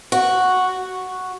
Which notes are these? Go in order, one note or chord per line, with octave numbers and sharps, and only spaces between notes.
F#4